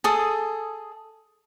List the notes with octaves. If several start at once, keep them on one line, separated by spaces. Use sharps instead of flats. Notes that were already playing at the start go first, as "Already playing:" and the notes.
G#4 A4 D#6